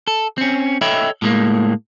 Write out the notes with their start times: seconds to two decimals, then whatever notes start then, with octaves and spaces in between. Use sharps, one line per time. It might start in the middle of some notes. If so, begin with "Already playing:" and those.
0.07 A4
0.38 C4 C#4
0.81 A4 C#5 D#5 E5 G5 B5
1.22 A2 G#3 A#3